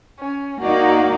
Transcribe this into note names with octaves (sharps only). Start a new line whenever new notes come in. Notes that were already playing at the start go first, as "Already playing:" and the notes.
C#4
A#3 D#4 F#4 D5